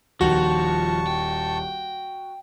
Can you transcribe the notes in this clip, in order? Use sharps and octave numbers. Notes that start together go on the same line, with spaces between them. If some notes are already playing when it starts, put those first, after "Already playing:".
D#1 D#3 F3 F#4 A5 C#6
G5